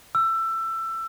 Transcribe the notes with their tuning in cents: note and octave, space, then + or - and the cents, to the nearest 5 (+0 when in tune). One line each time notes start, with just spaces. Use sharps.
E6 +20